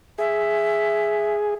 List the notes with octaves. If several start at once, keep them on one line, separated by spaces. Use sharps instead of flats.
G#4 E5